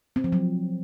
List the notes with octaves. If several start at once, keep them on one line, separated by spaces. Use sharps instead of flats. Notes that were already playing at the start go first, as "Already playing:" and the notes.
C4
F3
F#3